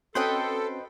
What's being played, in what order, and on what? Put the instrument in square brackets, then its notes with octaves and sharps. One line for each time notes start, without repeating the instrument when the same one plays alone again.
[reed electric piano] C4 C#4 F#4 [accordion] A4 [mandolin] B4 D#5 G5 [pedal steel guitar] C5